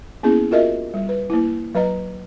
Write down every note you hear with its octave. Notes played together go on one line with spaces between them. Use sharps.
A#3 B3 C#4 E4 G#4
F4 F#4 A#4 D#5 E5
G3
B4
A#3 E4
F#3 B4 D#5 A#5